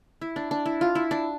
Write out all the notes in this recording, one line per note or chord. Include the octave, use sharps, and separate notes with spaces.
E4
D4
D4
E4
F4
E4
D4